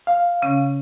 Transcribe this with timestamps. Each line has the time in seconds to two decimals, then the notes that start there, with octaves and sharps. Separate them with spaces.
0.07 F5
0.42 C#3 C#4